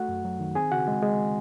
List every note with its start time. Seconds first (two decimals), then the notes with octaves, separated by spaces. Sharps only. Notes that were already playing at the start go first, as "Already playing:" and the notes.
Already playing: A3 F#4 F#5
0.09 F#2
0.24 F#3
0.40 D#3
0.55 C4 G#4 G#5
0.71 C#3 F#4 F#5
0.88 G#3
1.03 G#3